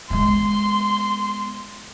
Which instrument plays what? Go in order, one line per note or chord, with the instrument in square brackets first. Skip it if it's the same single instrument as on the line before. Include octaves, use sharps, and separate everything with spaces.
[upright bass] G#3 B3 [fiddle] C6